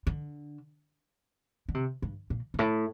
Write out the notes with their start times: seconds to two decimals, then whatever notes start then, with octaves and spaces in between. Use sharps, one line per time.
0.07 D3
1.69 D3
1.74 C3
2.02 G2
2.30 A#2
2.54 G2
2.59 A2